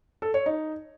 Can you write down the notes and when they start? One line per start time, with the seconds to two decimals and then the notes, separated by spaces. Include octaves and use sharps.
0.22 A4
0.34 C#5
0.46 D#4